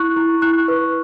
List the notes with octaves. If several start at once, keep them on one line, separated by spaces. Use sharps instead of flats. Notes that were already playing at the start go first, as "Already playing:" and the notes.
Already playing: E4 C#6 F#6
E4
E4 C#6 F#6
B4